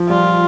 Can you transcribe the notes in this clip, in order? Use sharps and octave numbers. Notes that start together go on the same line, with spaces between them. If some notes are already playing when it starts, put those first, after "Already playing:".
Already playing: F3
G3 F4